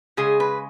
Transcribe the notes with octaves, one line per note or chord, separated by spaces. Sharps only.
C#3 G#3 G#4
B4